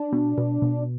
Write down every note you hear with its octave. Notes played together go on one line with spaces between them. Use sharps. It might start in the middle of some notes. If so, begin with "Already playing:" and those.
Already playing: D4
B2
B2
B2